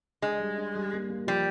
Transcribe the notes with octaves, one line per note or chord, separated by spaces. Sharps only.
G#3 D4
G3
D4
G3
A#3
A#3
F3 G3